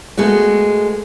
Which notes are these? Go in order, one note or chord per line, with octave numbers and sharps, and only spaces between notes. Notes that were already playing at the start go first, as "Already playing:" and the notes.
G#3 A3 B3 F#4